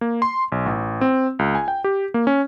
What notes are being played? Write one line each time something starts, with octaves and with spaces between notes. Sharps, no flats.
A#3
C6
B1
A1
C4
C#2
G#5
G5
G4
A#3
C#4